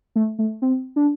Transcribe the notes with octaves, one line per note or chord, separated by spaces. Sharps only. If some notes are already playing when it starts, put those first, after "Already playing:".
A3
A3
C4
D4